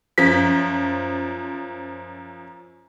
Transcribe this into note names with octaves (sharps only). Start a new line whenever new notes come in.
F#2 F3 B6